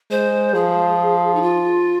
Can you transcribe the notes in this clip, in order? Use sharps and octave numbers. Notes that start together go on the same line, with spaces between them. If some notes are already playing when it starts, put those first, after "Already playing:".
G#3 C5
F3 G#4
D#4
F4